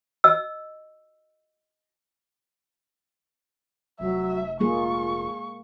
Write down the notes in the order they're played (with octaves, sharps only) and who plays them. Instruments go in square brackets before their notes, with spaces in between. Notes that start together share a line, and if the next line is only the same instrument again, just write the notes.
[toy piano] D#5 E6
[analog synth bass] F1 [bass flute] F#3 [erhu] E5
[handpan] G#3 A#3 G#4 [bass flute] F4 [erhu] C#6